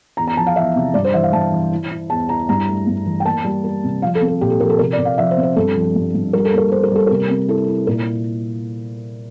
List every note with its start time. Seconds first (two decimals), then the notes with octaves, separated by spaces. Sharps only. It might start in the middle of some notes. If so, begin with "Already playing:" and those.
0.17 E2 A#5
0.27 A#5
0.37 F3 A5
0.47 F5
0.56 E2 E5
0.75 C3
0.94 G2 D5
1.04 C5
1.14 E3 E5
1.23 F5
1.33 G2 A5
1.52 E3
1.72 E4
1.91 E4
2.10 E2 A5
2.29 E4 A#5
2.49 G2 A#5
2.68 A3
2.87 G2
3.06 E3
3.20 G5
3.25 A#3 A5
3.45 G3
3.64 A#3
3.84 C3
4.02 F3 F5
4.15 A4
4.21 C4
4.28 A4
4.41 A#2 G4
4.50 A4
4.60 F3 A#4
4.70 A4
4.79 C3 A#4
4.93 D5
4.98 C3
5.05 F5
5.18 F3 E5
5.31 C5
5.37 C4
5.43 C5
5.56 G2 A4
5.75 F3
5.95 G2
6.14 G2
6.33 G3 A#4
6.45 A4
6.53 A#3
6.58 A#4
6.72 A#3 C5
6.83 A#4
6.92 G3 A4
7.07 C3 A#4
7.30 C4
7.49 E4 A4
7.68 E4
7.87 A#2 A#4